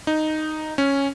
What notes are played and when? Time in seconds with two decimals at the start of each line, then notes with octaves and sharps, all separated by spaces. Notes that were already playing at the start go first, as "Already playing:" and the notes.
0.07 D#4
0.78 C#4